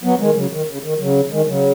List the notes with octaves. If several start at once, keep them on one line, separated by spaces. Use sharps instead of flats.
F#3 B3
D#3 G#3
C#3 F#3
D#3
C#3
D#3
C#3 F#3
D#3 G#3
C#3 F#3